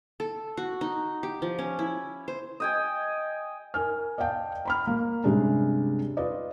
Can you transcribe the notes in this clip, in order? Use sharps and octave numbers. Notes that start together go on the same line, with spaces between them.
A4
F#4
D#4
G4
F3
C#4
E4
C5
D#5 G5 G#5
A#4 G#5 F6
D5 D#5 F5 G5 A5
A#5 B5 F6
A#3
G2 C3 G3 G#3 C#4 D4
F4 B4 D5 D#5